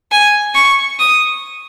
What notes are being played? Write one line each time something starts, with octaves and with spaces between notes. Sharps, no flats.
G#5
C#6
D#6